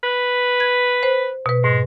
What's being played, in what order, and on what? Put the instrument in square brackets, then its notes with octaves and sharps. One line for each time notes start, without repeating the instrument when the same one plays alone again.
[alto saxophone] B4
[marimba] G#6
C5
B2 B4
[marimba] G#2 [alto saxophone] G#3